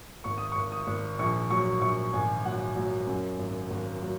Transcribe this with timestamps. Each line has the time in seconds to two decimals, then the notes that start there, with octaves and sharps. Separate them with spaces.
0.24 G#1 C#6
0.38 D#6
0.52 G#1 C#6
0.72 D#6
0.87 G#1
1.19 A#1 C#6
1.50 F#3 C#6
1.81 A#1 C#6
2.13 G#1 G#5
2.45 F#3 F#5
2.76 F#3
3.07 F#2
3.39 G#1
3.70 G#1
4.02 F#3